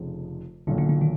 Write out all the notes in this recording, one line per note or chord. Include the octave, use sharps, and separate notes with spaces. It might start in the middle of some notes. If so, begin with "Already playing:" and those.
Already playing: F1 F2 C#3 F3
B1 A#2 D3 F#3
D3
D3
D#3